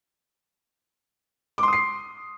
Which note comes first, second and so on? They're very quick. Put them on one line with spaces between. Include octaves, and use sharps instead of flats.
D6 C6 D#6 C7